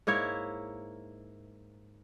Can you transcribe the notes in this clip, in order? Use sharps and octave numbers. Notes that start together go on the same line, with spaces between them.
G#2 A#3 E4 C#5